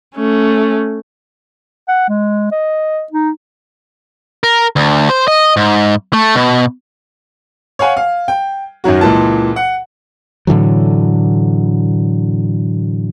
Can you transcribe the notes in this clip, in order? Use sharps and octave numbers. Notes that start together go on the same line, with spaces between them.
A3 C#4
F#5
G#3
D#5
D#4
A#4
D2
C5
D#5
G#2
A3
B2
C#5 F5 F#5 G#5
F5
G5
F#2 D#3 F#3 F#4
C#2 A#2 E3 A5
F#5
A2 D3 E3 F#3